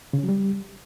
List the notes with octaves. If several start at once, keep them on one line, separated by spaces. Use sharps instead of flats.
C#3
C#4
F#3
G3